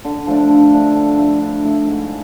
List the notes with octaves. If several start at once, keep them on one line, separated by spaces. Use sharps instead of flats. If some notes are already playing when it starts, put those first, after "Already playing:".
D3
F3 A3 D4
D3
F3 A3 D4
D3
F3 A3 E4
D3
F3 A3 E4
G#2